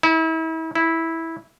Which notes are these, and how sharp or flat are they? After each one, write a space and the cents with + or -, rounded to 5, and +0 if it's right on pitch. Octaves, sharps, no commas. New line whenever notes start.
E4 -35
E4 -10